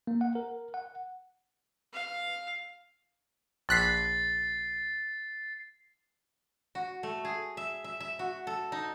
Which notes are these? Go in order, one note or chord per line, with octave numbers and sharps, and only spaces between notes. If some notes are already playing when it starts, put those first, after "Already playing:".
A#3
F#5
A#4
F#5
F5
A#1 F#6 A6 B6 C7
F#4
A3
G#4
E5
E5
E5
F#4
A4
D#4